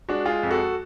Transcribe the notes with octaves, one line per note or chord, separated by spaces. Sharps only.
G#3 D4 F#4
G#3 F4 G#4
F2
F#4 A4